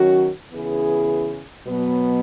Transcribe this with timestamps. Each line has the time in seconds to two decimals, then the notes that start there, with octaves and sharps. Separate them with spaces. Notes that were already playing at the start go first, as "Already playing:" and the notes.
Already playing: D#3 F#3 C#4 F#4
0.53 C#3 E3 B3 E4 G#4
1.67 B2 F#3 B3